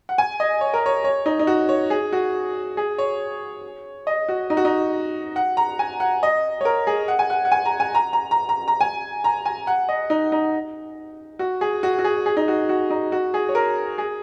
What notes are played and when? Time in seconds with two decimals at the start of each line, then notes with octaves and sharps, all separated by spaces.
0.09 F#5
0.18 G#5
0.40 D#5
0.61 C#5
0.74 A#4
0.86 C#5
1.04 C#5
1.26 D#4
1.39 D#4
1.47 F#4
1.69 C#5
1.90 G#4
2.13 F#4
2.77 G#4
2.98 C#5
4.07 D#5
4.29 F#4
4.50 D#4
4.57 F#4
4.65 D#4
5.36 F#5
5.57 A#5
5.79 G#5
6.00 F#5
6.23 D#5
6.61 C#5
6.65 A#4
6.87 G#4
7.08 F#5
7.19 G#5
7.30 F#5
7.45 F#5
7.52 G#5
7.65 A#5
7.80 G#5
7.95 A#5
8.13 A#5
8.31 A#5
8.49 A#5
8.68 A#5
8.81 G#5
9.24 A#5
9.45 G#5
9.67 F#5
9.89 D#5
10.10 D#4
10.32 D#4
11.39 F#4
11.61 G#4
11.83 F#4
11.99 F#4
12.04 G#4
12.26 G#4
12.37 D#4
12.48 F#4
12.69 F#4
12.90 D#4
13.12 F#4
13.34 G#4
13.49 C#5
13.55 A#4
13.98 G#4